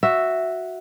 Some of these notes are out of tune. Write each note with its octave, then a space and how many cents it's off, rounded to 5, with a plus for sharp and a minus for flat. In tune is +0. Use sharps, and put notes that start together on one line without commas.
F#4 +0 E5 +0